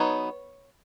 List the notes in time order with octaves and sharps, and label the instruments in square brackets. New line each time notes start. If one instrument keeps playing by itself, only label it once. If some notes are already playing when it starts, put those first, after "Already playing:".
Already playing: [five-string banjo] F#3 B3 D#4 C#5